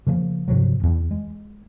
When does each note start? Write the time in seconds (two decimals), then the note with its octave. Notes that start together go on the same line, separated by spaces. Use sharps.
0.07 C#3 F3 G#3 A#3
0.48 G2 C3 F3 F#3
0.80 D#1 E2
1.11 G#3